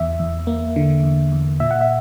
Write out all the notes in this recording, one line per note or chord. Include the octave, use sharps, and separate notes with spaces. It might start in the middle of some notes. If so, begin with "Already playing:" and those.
Already playing: E2 E5
E2
A#3
D3
E2
E2
A#2 E5
F#5
E5